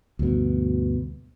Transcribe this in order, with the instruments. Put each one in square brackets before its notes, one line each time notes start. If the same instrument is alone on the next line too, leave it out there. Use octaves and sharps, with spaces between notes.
[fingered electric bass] D2 G2 B2